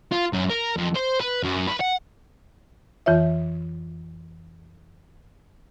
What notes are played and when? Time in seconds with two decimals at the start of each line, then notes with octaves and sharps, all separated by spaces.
0.12 F4
0.33 F#2
0.50 A#4
0.77 F2
0.95 C5
1.20 B4
1.43 F#2
1.67 B4
1.81 F#5
3.06 F2 E3 F4 C#5 E5